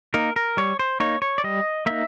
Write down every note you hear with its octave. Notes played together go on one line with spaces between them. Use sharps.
A#3 D#4 A#4
A#4
G3 C#5
C5
A#3 D#4 C#5
C#5
D5
G3 D#5
A#3 D#4 E5